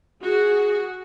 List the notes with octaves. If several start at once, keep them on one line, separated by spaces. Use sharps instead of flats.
F#4 G#4